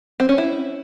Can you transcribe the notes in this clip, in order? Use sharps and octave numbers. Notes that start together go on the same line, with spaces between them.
C4
C#4
E4